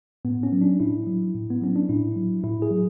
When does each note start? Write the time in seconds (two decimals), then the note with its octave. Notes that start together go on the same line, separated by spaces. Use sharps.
0.25 A2 B3
0.43 C#4
0.53 F#3
0.61 D4
0.80 A2 E4
1.07 F#3
1.35 A2
1.50 B3
1.61 F#3 C#4
1.76 D4
1.89 A2 E4
2.16 F#3
2.44 A2 E4
2.62 G#4
2.71 F#3